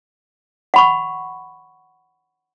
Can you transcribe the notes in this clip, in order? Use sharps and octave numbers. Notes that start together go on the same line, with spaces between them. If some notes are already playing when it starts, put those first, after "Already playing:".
F#5 B5 C#6